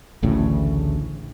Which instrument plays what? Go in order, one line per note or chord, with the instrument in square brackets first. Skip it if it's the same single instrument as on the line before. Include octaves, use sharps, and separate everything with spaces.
[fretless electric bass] A1 D2 A2 C#3